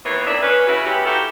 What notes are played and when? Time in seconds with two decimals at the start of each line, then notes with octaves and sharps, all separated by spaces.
0.05 D#2 C3 E3 A#3 B3 C#5
0.27 F2 A#3 D4 E4 E5
0.42 C#4 B4
0.68 C#3 E4 F#4
0.86 G#3 B3 C#4 E4 G4
1.06 D#4 E4 F#4 G4 A4 F5